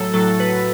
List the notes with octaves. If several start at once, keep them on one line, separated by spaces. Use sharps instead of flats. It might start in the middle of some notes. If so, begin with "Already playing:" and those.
Already playing: A2 F#3 A4
A2 F#3 A4
B4